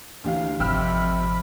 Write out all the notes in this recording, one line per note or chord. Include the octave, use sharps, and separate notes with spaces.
D2 E3 G4 F5
G#1 F2 C3 G5 B5 E6 F6